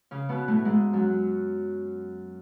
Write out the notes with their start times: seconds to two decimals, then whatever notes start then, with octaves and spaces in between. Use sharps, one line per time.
0.11 C#3 C#4
0.29 B2 B3
0.48 A2 A3
0.65 G#2 G#3
0.93 F#2 F#3